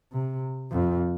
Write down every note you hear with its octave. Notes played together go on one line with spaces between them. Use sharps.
C3
F2